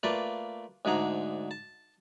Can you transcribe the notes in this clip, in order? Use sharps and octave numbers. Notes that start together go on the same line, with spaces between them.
A3 A#3 F4 B4 D5
D2 G#2 D3 G#4 A#5
A5